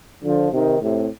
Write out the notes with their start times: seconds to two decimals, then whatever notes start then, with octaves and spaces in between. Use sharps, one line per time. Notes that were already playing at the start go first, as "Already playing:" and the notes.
0.24 D3 F3
0.52 C3 D#3
0.81 A2 C3